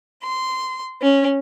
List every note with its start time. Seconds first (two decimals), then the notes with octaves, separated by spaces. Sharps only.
0.23 C6
1.01 C#4